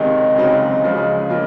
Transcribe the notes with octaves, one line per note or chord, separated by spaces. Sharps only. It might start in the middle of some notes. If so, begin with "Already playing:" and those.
Already playing: C#2 C3 D#3 D#5
C#2 C#3 F#3 C4 D#4
C#2 C#3 F3 G#3
C#3 F3 A#3 F4